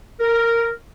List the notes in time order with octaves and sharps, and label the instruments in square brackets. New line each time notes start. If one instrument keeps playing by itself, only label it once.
[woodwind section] A#4